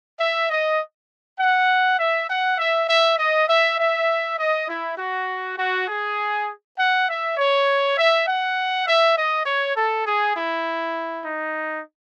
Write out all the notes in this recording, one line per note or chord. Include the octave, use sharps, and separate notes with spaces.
E5
D#5
F#5
E5
F#5
E5
E5
D#5
E5
E5
D#5
E4
F#4
F#4
G#4
F#5
E5
C#5
E5
F#5
E5
D#5
C#5
A4
G#4
E4
D#4